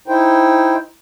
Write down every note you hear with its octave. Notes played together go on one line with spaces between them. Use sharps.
D#4 E4 C5 G5